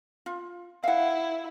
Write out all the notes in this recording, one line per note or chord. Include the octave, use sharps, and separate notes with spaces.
F4
E4 F5 F#5